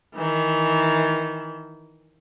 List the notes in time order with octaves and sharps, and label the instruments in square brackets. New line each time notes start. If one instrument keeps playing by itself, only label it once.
[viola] D#3 E3